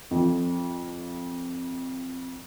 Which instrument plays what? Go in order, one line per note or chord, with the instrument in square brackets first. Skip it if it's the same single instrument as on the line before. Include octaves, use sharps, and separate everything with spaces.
[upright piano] F2 F3